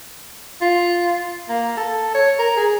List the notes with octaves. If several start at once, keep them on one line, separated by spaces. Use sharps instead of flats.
F4
A#3
A4
C#5
A#4
G#4